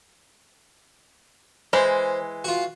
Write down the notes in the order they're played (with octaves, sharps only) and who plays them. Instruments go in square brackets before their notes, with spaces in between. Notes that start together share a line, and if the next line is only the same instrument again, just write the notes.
[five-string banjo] E3 G#3 [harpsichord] C5
[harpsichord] F4 F#4